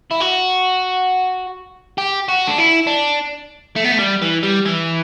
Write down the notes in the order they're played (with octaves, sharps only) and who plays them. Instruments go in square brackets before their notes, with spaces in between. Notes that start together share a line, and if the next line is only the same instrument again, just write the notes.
[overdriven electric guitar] E4
F#4
G4
F#4
D4
E4
D4
A3
B3
A3
G3
E3
G3
E3